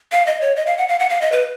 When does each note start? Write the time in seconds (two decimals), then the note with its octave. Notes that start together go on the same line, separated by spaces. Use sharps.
0.12 F5
0.26 D#5
0.41 C#5
0.56 D#5
0.66 F5
0.78 F#5
0.88 F5
0.99 F#5
1.10 F5
1.21 D#5
1.32 B4